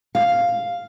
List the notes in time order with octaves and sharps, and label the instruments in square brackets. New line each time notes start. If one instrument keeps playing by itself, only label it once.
[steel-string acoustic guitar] F5